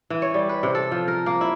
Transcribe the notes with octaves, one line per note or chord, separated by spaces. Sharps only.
E3
C#5
G3
B4
C3
A4
F3
A#4
A#3
E4